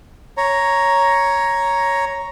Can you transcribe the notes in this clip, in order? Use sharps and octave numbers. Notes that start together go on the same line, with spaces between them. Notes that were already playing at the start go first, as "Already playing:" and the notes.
C#5 A#5